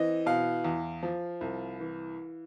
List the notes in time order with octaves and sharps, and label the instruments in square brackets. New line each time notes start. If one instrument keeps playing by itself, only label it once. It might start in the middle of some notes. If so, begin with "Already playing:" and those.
Already playing: [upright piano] E3 C4 D#5
B2 F5
E2
F3
C2
E3